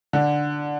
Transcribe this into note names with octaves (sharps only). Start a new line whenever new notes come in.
D3